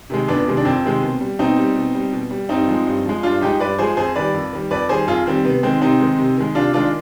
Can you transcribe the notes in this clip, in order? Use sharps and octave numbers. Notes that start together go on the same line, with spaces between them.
C3 D#3 G#3
F2 B3 D4
C3 D#3 G#3
D4
F2 C4
C3 D#3 G#3
B2
G3
B2 C4 D#4
G3
B2
G3
B2
G3
G2 C4 D#4
F3 G#3
G2
F3 G#3
G2 D4 F4
F3 G#3 D#4 G4
G2 B4 D5
F3 G#3 G#4 C5
F2 G#4 C5
D#3 G3 B4 D5
F2
D#3 G3
F2 B4 D5
D#3 G3 G#4 C5
F2 F4 G#4
D#3 G3 C4
C3 B3
D#3 G#3 C4
C3 C4 D#4
D#3 G#3
C3
D#3 G#3
C3 D4 F4
D#3 G#3 D4 F4